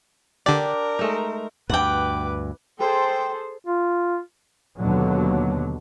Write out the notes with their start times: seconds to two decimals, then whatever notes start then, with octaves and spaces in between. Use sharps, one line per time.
0.46 D3 D4 G4 A#4 D5
0.99 G#3 A3 D#4
1.69 D2 G2 B4 F#5 G5 D6
2.79 G#4 A4 C5 G5
3.67 F4
4.78 D#2 B2 D3 F#3